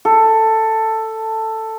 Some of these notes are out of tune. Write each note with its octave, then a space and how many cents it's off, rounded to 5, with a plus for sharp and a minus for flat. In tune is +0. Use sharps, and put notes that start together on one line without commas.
A4 +10